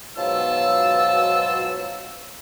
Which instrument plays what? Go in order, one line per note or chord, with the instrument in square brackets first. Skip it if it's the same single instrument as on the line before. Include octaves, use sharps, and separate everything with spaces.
[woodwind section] G#2 B2 F#3 [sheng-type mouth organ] F4 A5 [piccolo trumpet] E6